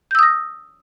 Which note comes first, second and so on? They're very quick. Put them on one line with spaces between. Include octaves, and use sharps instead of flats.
G6 E6 D#6 A#6